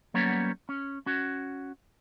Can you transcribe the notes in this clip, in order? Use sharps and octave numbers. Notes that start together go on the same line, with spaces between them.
F#3 G3 A#3 B3 C#4 C#5
C#4
C#4 F#4